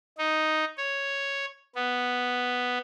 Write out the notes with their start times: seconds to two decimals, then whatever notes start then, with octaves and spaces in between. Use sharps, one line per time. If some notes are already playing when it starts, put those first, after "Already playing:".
0.18 D#4
0.77 C#5
1.75 B3